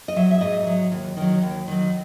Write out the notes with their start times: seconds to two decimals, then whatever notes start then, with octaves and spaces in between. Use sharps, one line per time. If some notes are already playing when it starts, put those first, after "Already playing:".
0.08 D#5
0.16 F#3 E5
0.31 E5
0.41 G#2 D#5
0.67 F#3
0.92 D#2
1.17 D#3 F#3
1.42 D#2
1.68 D#3 F#3